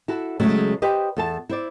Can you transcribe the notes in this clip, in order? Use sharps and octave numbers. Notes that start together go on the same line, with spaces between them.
E4 F#4 A4
C#3 F#3 G#3 A3
G4 B4 C5 D#5
E2 A4 A5
E4 C5 D5